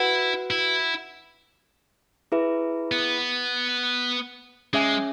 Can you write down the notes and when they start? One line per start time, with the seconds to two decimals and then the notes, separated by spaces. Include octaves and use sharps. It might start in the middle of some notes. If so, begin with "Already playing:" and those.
Already playing: E4 F#4 B4 F#5
0.51 E4
2.32 E4 G#4 B4 E5
2.92 B3
4.73 G#3 C#4 G#4 E5 G#5